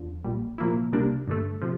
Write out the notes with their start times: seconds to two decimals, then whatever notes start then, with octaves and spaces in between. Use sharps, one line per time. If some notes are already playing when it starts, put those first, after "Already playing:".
Already playing: E2 D3 F3
0.24 A#1 A#2 G3
0.58 C2 A#2 F3 A#3 E4
0.93 C2 C3 G3 A#3 D4
1.27 G2 D3 A3
1.61 C3 F3